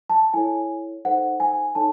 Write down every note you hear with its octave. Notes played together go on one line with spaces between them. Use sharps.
A5
E4 A4 C#5 G#5
D#4 A4 C5 F#5
G#5
D#4 A4 C#5 A5